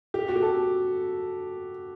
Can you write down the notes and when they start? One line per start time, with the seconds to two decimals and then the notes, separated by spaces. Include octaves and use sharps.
0.14 G4
0.29 F#4
0.36 G4
0.42 A4